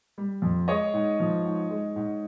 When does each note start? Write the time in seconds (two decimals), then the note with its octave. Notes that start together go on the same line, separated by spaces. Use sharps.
0.18 G3
0.42 F2
0.68 G#3 C#5 D#5
0.94 G#2
1.20 F3
1.45 G#2
1.71 G#3
1.96 G#2